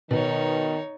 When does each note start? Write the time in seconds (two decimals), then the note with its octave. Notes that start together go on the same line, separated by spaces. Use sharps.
0.11 B2 D#3 B3 D#4 C#5